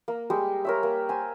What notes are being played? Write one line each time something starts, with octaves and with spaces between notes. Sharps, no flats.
A#3
G3 G#3 G4
A#4 C#5 E5
A#3
C5 G#5